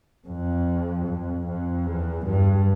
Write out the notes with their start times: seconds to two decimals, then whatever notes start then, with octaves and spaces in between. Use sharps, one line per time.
0.28 F2
1.06 F2
1.47 F2
1.86 E2
2.26 G2